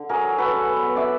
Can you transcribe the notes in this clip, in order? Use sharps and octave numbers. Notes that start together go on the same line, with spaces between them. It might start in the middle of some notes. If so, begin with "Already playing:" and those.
Already playing: D3
F#3 G#4 A#4
F#3
F#3 A4 B4
D3
B3
B3
D3 D5 E5